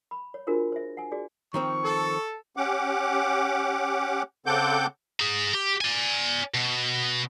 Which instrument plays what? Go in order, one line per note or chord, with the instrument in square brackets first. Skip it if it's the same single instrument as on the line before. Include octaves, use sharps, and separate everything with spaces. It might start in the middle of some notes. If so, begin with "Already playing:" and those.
[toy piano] B5
C#5
D4 F4 F#4 G#4 A#4 C5
C5 E5
F#5 G#5
F#4 G#4 D5
[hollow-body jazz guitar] D#3 F3 C4 [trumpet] C#6
[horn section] A4
[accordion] C#4 G4 F#5 D6
C#3 C4 A4 F#5 D6 G6
[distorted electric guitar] G#4 A#5
G4
D5 G#5
B2